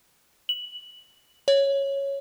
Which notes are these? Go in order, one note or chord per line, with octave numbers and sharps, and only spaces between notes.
F#7
C#5